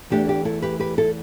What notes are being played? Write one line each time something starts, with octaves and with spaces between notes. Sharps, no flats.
E2 E3 A3 D4 G4
G4
E4 A4
G4 B4
G4 B4
E4 A4